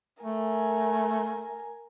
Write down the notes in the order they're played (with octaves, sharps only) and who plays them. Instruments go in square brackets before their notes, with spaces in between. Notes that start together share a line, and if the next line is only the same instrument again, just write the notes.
[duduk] A3 [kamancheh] A#4 G#5